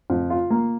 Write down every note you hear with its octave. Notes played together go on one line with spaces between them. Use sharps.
F2
F4
A#3